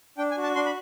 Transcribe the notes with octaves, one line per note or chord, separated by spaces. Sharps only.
D4 G5
G#5
F#4
A5
D4 C6
B5